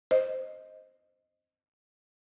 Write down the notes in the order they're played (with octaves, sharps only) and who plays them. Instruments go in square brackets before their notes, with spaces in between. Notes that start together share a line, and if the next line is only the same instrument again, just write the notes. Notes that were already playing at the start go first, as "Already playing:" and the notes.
[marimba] C5 D#5